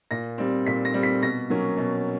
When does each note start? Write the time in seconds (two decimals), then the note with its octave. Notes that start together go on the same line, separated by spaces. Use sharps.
0.11 A#2 A#6
0.38 G3 C4
0.66 A#2 B6
0.85 A#6
0.94 G3 C4
1.03 B6
1.22 B2 A#6
1.50 F#3 A#3 C#4
1.78 B2